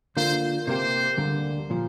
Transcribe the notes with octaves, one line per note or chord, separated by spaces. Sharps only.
D3 A#3 F4 C5
C3 A#3 G4 C5
D2 D3 G3 A#3
A#2 F3